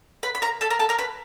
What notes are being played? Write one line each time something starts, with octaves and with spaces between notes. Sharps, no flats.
B4 B5
B5
A#4 A#5
A4 A5
A#4 A#5
A4 A5
A#4 A#5
B4 B5